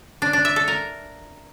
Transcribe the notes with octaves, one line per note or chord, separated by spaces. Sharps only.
D4
D4
E5
A4
A#4